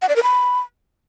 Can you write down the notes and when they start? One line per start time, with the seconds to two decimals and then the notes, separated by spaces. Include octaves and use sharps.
0.02 F#5
0.09 D5
0.16 A#4
0.23 B5